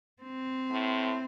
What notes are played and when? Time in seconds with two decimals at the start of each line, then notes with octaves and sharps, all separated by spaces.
0.22 C4
0.71 A2